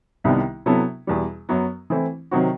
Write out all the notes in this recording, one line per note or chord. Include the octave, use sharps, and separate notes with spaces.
C2 C3 D#3 G3 B3
C3 F#3 B3 E4 A4
E2 B2 G3
F#2 F#3 B3
E3 A3 C4 E4
C3 D#3 F#3 C4 F#4